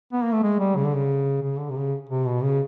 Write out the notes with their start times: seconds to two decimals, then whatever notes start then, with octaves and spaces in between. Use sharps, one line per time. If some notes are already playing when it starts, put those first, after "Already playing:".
0.12 B3
0.23 A#3
0.32 A3
0.43 G#3
0.59 G3
0.76 C#3
0.84 D3
0.94 C#3
1.42 C#3
1.59 D3
1.70 C3
1.77 C#3
2.09 C3
2.26 B2
2.43 C#3